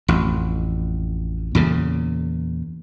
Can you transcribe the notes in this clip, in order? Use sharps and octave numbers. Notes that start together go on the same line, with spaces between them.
A1 F2
E2 A#2 C#3